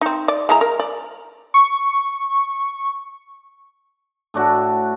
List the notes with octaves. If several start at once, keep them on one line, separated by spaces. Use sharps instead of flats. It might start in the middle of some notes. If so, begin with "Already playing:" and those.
C4 D#4
D5
G#3 E4 A#5
A#4
D5
C#6
A2 D4 F#4